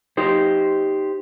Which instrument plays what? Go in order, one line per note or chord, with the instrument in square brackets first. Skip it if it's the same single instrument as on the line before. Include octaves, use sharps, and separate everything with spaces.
[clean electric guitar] D#4 G4 C5